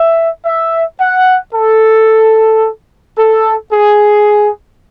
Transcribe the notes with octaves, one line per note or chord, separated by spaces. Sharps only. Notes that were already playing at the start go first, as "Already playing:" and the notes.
Already playing: E5
E5
F#5
A4
A4
G#4